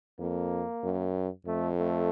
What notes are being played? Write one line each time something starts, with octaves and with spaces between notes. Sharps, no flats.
F2 A#3
F#2
F2 A3
A3